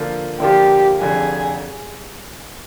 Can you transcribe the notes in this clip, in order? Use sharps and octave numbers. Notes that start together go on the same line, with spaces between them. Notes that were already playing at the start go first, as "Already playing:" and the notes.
Already playing: D3 F3 A#3 F4
D3 F3 A#3 F4 G4
F1 F2 D3 G#4